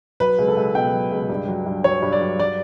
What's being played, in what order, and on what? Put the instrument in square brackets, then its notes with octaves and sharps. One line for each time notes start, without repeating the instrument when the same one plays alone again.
[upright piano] F#3 B4
C#2
A4
C#2
B2 G5
F#3
C#2
G2
F#3
G2
F#3 C#5
G2
D5
F#3
F#3 D5